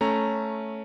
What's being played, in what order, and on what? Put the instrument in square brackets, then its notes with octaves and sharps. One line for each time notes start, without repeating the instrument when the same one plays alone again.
[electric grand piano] A3 C#4 A#5